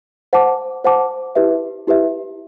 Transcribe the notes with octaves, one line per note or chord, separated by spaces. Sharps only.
C5 F#5 A5 D6
C5 F#5 A5 D6
E4 G4 B4 E5
E4 G4 B4 E5